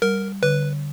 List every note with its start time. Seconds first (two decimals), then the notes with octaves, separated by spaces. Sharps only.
0.02 G3 A#4
0.42 D3 B4